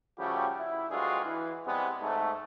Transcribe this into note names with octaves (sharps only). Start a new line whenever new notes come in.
C#3 F3 G3 A3 F#4 G4
E4
D2 G2 G#3 F4 F#4 G#4
E3
C3 G3 G#3 B3
G#2 A3